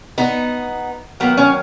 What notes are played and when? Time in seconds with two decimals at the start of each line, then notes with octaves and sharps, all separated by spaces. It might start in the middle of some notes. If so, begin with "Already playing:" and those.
0.18 B3 D#4
1.20 D#3 F#3 A#3 B3
1.37 C#4